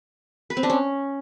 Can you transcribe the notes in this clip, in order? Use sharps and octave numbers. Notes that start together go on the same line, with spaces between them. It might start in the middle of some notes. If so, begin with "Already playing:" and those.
B4
C4
D4
C#4